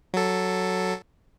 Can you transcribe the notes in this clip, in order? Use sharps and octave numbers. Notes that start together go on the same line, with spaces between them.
F#3 A4